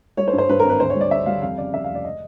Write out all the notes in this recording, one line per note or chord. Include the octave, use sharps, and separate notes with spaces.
G3 C#5
C5
G2
C5
G2 B4
G#1 A#4
B4
D2 C5
C#5
G3
D5
D2 E5
G3 F5
F2 F5
C#3 D5
F2 E5
F1 F5
D5
D#5